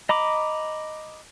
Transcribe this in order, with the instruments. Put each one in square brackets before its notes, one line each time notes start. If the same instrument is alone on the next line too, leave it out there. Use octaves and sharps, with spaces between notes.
[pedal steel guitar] D#5 A#5 B5 D6